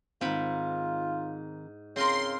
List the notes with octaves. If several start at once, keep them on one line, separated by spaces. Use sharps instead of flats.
G#2 D#3 C4 F4 B5
C#3 C4 F4 A#4 C6